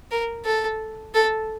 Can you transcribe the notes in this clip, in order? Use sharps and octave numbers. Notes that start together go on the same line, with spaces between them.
A#4
A4
A4